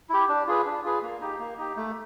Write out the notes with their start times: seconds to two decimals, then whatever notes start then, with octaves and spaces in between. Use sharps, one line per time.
0.10 E4 G4
0.28 D4
0.47 F4 G#4 B4
0.66 D4
0.84 F4 G#4 B4
1.02 A#3
1.21 D#4 G4
1.39 A#3
1.58 D#4 G4
1.77 A3